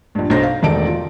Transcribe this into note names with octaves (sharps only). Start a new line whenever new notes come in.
A#1 G2
B1 G2 D#4 C5 A#6
F5
E1 D#3 A3 D5 A5 D7
F4